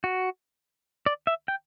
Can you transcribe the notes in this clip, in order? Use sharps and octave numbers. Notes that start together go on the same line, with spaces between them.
F#4
D5
E5
G5